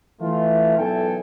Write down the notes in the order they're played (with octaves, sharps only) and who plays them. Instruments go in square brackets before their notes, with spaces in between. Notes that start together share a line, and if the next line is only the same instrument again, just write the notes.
[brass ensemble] E3 A3 F4
B1 E2 E3 A4 G5 G#5